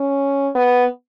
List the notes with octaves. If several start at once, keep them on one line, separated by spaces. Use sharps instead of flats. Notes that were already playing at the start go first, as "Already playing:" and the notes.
Already playing: C#4
B3